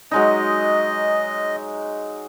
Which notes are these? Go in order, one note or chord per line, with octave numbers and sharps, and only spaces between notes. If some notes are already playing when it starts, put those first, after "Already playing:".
F#3 G#3 D#4 D#5